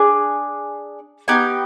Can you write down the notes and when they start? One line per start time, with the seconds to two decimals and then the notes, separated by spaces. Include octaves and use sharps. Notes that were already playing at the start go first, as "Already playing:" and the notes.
Already playing: D4 G#4
1.28 B3 D#4 G4 G#5